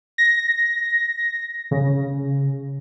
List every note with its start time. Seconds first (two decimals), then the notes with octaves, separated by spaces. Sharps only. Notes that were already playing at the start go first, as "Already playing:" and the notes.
0.18 A#6
1.71 C#3